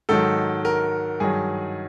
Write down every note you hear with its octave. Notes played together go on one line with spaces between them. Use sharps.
G#2 D#3 F#3 A4
A#4
G2 D#3 F#3 G#4